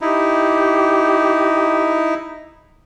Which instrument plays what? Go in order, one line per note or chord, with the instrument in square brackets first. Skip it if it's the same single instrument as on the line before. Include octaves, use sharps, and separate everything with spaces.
[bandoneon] D#4 E4 [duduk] G4